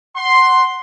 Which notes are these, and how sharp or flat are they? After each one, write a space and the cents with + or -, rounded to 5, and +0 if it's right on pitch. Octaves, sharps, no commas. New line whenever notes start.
F#5 +0 C6 +5